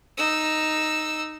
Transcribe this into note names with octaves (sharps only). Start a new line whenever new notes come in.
D#4 E6